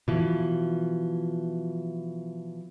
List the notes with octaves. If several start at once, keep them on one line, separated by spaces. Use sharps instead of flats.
B2 E3 F3